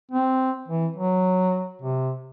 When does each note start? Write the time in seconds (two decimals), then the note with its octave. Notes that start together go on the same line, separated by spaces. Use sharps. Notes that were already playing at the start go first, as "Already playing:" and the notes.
0.11 C4
0.68 E3
0.96 F#3
1.82 C3